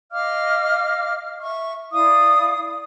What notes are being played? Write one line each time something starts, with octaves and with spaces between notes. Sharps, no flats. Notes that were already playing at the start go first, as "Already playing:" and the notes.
D#5 F5 D6 F6
E5 C#6
E4 D5 F5 D#6